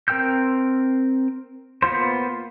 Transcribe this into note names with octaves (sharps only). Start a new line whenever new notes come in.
C4 A#4 G5 E6 G6
A#3 B3 F4 C5